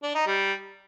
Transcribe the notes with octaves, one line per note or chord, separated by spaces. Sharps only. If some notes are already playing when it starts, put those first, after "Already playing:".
D4
D#4
G3